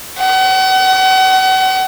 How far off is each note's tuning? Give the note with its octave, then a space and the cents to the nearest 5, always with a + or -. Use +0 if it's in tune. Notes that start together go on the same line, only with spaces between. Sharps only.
F#5 +35